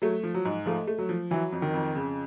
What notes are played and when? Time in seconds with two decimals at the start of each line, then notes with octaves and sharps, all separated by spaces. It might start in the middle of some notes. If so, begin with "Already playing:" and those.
0.02 F#3 A3
0.23 F3
0.34 F#3
0.45 G#2
0.66 F3 A3
0.87 A3
0.98 F#3
1.09 F3
1.31 E3 F#3
1.52 F2
1.62 D#3
1.74 F2
1.95 C#3